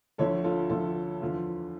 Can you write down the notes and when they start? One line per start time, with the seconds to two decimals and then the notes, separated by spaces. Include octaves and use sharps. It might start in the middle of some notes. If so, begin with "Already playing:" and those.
0.18 D2 D3 F3 A4 C#5
0.44 F4 A4
0.70 D2 D3 F3 F4 A4
1.21 E2 D3 F3 F4